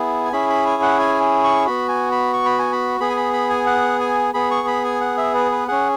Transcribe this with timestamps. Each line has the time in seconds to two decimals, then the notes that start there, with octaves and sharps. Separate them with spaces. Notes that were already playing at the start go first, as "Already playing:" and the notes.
Already playing: B3 E4 G#4
0.25 G#5
0.33 C#4 E4 G#4 B5
0.49 B5
0.66 G#5
0.83 F#5
0.99 G#5
1.44 C#6
1.66 B3 F#4 B5
1.89 G#5
2.12 B5
2.33 C#6
2.46 B5
2.59 G#5
2.72 B5
3.00 B3 G#4 B5
3.10 G#5
3.17 B5
3.33 B5
3.50 G#5
3.67 F#5
4.00 G#5
4.34 B3 G#4 B5
4.51 C#6
4.68 B5
4.85 G#5
5.01 F#5
5.18 E5
5.35 B4
5.52 B4
5.68 C#4 G#4 F#5